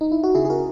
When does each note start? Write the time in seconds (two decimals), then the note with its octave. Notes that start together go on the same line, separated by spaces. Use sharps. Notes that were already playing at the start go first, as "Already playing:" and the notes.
0.01 D#4
0.12 E4
0.24 F#4
0.35 C#3 E4 G#4
0.45 G#4
0.50 F#4 A#4